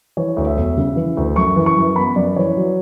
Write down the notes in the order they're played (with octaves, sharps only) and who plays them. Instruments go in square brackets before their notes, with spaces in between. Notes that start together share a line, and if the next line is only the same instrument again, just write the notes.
[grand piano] E3 C#5
D2
E5
E1
C#3
E3
D2
F#2 C#6
E3
C#6
F#2
B3 B5
F#2 D5
E3 C#5
F#3